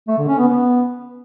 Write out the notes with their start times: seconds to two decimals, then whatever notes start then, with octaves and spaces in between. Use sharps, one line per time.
0.08 A3
0.18 D3
0.28 C#4
0.38 B3
0.49 B3